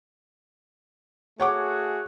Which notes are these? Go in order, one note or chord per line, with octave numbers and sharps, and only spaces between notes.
A3 F#4 G#4 C#5 F#5 D6